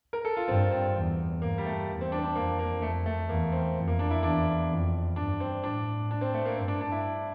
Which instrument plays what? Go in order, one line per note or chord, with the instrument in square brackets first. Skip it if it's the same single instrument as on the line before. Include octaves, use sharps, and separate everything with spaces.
[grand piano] A#4
A4
F4
[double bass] G2 [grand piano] C4
[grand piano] C4
[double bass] E2
[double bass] G2 [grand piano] A#3
[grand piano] G3
A3
[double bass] E2
[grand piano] C4
D4
C4
D4
[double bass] F2 [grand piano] A#3
[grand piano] A#3
[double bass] F2 [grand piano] A3
[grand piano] A3
[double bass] E2 [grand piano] A#3
[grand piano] C4
[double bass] F2
[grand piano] A#3
D4
E4
[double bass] E2 [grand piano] D4
[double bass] F2
[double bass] G2 [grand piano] D4
[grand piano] C4
[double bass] A2 [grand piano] D4
[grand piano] D4
C4
A3
A#3
[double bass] G2 [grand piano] C4
[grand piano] D4
D4
E4